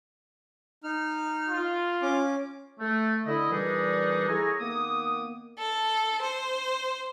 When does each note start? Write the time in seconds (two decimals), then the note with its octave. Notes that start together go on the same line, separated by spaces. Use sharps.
0.84 D#4 F6
1.49 F4
2.02 C#4 D6
2.79 A3
3.26 D3 E4 D#5
3.50 A#2 E3 G3 D4 D#4 G#4
4.27 E4 G#4 A4 C#5 G#5 A#5
4.60 D#3 A#3 B3 D6 D#6
5.59 A4
6.22 C5